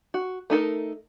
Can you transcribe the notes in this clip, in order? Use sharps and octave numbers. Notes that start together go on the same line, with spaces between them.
F#4
A3 D#4 A4 A#4